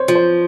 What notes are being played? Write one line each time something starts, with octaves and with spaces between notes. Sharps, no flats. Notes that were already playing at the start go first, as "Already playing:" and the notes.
Already playing: C5 C#5
F3
C5